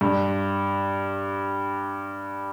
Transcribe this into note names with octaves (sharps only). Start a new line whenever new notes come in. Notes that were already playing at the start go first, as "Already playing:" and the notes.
G2